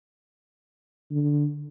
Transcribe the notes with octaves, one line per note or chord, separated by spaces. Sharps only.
D3